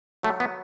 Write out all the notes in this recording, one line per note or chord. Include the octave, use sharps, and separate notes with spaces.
F#3 A3
B3